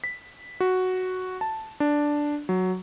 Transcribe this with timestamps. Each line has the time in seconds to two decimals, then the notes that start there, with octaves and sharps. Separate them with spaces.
0.04 B6
0.60 F#4
1.41 A5
1.80 D4
2.49 F#3